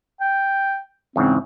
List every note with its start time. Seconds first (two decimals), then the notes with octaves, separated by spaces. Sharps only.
0.21 G5
1.16 E2 G#2 C#3 C4